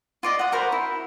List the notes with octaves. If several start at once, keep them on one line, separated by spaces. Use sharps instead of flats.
F4 D5 D#5
F#5 D#6
F#4 A#4 C5 B5
E4